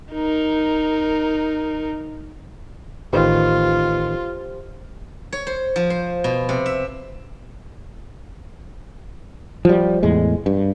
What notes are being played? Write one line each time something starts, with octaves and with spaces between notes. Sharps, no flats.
D#4 A#4
A1 D#3 F4 G4 B4 C5
C#5
C5
F3
C5
B2
C3
E5
F3 G3
E2 A2 G#3
G2